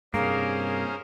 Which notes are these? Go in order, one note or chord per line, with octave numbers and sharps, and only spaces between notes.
G2 C3 A#3 C#4 G#4 A#4 C5